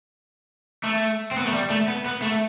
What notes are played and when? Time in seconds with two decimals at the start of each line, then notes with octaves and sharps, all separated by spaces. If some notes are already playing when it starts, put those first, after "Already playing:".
0.83 A3
1.31 C4
1.38 B3
1.46 A3
1.53 G3
1.70 A3
1.87 B3
2.06 B3
2.22 A3